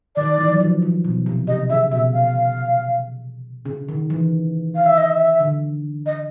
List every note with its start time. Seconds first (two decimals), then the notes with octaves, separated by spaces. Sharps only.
0.16 D#3 D5
0.38 E3
0.51 F#3
0.60 F3
0.82 F3
1.04 B2
1.26 C3
1.47 C3 D#5
1.70 C#3 E5
1.91 B2 E5
2.13 F5
3.65 C#3
3.89 D#3
4.10 E3
4.75 F5
4.86 E5
4.98 D#5
5.10 E5
5.40 D3
6.06 D#5